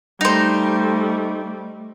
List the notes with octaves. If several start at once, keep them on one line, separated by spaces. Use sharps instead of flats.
G3 A3 D#4 C5